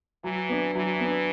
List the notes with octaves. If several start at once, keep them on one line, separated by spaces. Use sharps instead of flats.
E3 F#3
B3 D4
E3 F#3
B3 D4